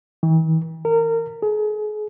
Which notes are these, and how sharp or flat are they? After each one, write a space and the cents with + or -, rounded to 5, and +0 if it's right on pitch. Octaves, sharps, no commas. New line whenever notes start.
E3 -45
A#4 -25
G#4 +35